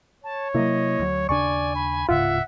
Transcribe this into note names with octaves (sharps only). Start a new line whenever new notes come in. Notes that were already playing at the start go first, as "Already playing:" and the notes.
C#5 A5
C3 F#3 A#3 E4 D#5
D2 F#3
D#2 C#3 D4 D5 G#5 C#6
B5
D1 G#2 C#3 F4 E5 F#5